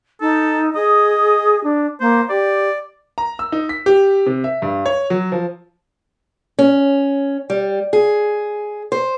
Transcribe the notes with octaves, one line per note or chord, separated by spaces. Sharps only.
D#4 A4
G#4 D#5
D4
A#3 C5
G4 D5
A#5
E6
D#4
B6
G4
C3
E5
G2
C#5
F#3
F3
C#4
G3
G#4
C5